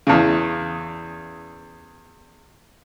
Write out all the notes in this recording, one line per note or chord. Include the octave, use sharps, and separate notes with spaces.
E2 C#3